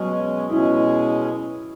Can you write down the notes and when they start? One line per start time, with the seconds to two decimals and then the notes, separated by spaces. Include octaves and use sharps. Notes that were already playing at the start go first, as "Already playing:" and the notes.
Already playing: B2 F#3 G#3 C#4
0.49 B2 G#3 C#4 E4